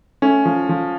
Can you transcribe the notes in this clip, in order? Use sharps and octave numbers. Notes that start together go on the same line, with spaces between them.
A3 C#4
F3
F3